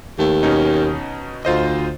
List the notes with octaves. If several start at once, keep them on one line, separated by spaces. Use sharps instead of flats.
D#2 A3
B2 C#4 D#4
D2 F4 C5 D#5